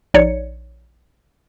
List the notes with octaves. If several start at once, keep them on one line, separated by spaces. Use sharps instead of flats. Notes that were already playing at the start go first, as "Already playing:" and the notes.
A#1 D#4 C#5 D5 C#7